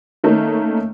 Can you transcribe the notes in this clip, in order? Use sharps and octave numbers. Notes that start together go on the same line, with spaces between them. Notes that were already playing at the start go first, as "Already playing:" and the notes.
D#3 A3 A#3 C#4 D#4